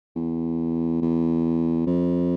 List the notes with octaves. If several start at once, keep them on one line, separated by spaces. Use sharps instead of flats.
E2
E2
F2